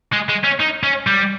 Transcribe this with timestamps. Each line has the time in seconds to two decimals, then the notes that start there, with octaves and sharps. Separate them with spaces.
0.13 G#3
0.29 G#3
0.44 C#4
0.60 D#4
0.84 C#4
1.07 G3